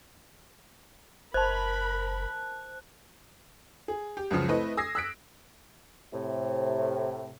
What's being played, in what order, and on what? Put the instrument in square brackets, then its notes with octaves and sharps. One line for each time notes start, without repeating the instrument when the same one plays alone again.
[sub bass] F#1 [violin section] A#4 B5 [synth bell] C5 A5 [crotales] F#6
[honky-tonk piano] G#4
G4
C#2 F#2 C#3 F3
A3 C4 E4 B4 D#5
D#6 E6 G#6 A#6 C7
E6 F#6 B6 D7
[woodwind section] A2 C3